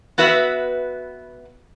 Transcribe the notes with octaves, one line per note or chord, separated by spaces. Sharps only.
B3 F#4 B4 E5